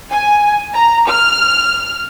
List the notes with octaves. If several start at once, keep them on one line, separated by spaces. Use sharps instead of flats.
G#5
A#5
F6